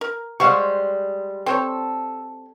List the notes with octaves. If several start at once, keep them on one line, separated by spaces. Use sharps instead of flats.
A#4
G3 G#3 C5 F5 F#5 C#6
C4 A4 C5 C#5